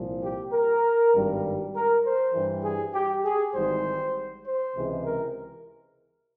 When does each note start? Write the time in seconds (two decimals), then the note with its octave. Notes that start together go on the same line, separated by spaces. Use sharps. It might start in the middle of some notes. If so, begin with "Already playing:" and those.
Already playing: C2 A#2 F3
0.23 G4
0.53 A#4
1.13 G#1 G2 G3
1.75 A#4
2.04 C5
2.34 G2 E3 G3
2.64 G#4
2.94 G4
3.25 G#4
3.55 G#1 G#2 E3 G3 C5
4.45 C5
4.75 C#2 C3 E3 G#3
5.05 A#4